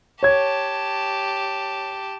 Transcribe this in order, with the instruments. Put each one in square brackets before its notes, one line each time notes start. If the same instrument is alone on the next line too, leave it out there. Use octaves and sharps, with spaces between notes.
[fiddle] G4 A5 [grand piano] C#5 G#6